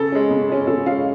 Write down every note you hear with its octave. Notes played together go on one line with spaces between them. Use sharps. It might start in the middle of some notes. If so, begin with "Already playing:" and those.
Already playing: C#3 A4
G#3 C#4
C#3
G#3 C#4
C#3 A4
G#3 C#4 F5